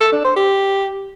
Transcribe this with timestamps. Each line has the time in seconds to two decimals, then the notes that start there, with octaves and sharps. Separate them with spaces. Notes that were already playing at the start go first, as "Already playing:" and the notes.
0.01 A4
0.12 D4
0.24 C5
0.36 G4